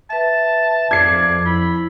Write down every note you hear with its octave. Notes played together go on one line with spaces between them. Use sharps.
B4 E5 A5
F2 F4 D5 G#6 C7
E4 B5